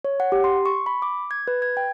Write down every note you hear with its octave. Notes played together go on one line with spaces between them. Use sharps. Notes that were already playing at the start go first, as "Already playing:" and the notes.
C#5
F#5
G4
C6
C#6
B5
D6
G#6
B4
G#6
G5